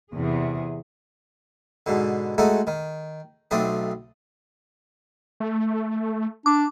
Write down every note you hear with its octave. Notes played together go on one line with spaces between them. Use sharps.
E2 C3 G#4
G#2 B2 D3
G#3 A3 D#4 F#4 A4
D#3
B1 A3 C4 D4 D#5
A3
D4 D6